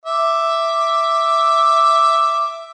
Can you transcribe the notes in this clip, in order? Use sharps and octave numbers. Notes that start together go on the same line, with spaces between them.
E5 D6